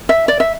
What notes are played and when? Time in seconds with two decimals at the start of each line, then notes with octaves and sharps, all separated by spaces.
0.09 E5
0.28 D5
0.40 E5